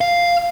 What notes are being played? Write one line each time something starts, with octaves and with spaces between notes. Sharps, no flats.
F5